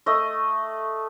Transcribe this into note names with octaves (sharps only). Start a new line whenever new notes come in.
A3 D#5